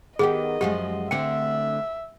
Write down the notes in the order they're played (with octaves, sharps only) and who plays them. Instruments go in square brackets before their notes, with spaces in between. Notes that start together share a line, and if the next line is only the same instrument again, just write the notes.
[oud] D#3 B3 G4 [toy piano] G#4 [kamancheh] D#5
[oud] F#2 F3 G#3 [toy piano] G4
[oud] D2 D3 C4 [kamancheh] E5 [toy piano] G5